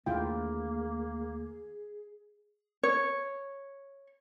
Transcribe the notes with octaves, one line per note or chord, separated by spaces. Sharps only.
D#2 D3 A3 A#3 E4 F4 G#4 G5
C#5